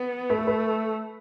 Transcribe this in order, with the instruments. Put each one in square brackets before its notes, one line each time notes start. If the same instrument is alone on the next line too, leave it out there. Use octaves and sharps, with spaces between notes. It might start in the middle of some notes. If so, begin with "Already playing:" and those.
Already playing: [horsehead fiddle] B3
[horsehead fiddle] A3 [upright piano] B4
[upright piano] A4
B4